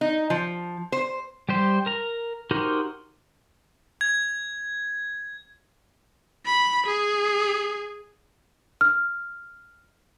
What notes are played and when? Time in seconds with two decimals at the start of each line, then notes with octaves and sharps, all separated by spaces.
0.01 D#4
0.30 F3
0.92 C5
1.49 G3 G4 C5
1.86 A#4 A#5
2.51 D#4 F#4 G4 A#4 C5
4.01 G#6
6.46 B5
6.86 G#4
8.81 F6